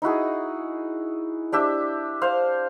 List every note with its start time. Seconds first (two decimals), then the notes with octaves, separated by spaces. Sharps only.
0.02 D#4 E4 F#4 G#4
1.52 D4 G4 E5
2.22 C5 F5